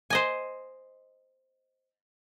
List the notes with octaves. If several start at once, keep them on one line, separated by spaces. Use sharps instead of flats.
C5 D#5 G#5